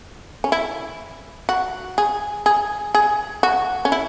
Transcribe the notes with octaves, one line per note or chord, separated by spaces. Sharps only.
C#4
E4
F#4
G#4
G#4
G#4
F#4
C#4
E4